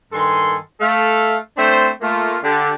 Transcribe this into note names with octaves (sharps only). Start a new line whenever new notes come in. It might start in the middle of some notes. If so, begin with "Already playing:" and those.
G2 D#3 A4 G#5 C6
A3 A4 F5
A3 C4 D4 C5
A3 A#3 F4
D3 G4